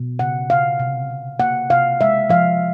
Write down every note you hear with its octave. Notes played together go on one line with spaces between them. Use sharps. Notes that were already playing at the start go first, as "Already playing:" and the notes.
Already playing: B2
C#3 F#5
C#3 F5
C3
C3
A#3 F#5
C3 F5
G#3 E5
F3 F5